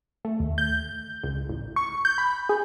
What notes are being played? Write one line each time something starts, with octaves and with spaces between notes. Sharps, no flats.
A3
D#2
G6
C#2
A1
C#6
G6
B5
G#4